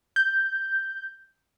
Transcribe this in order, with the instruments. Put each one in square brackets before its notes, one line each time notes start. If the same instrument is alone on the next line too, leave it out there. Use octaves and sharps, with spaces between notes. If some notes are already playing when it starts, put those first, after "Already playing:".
[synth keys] G6